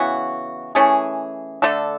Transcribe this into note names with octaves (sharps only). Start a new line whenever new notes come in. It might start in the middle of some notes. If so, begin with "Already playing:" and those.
Already playing: C#3 E3 B3 F#4
E3 A3 C#4 G#4
D3 A3 D4 A4